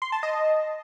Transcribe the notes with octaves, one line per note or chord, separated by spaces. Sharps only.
C6
A5
D#5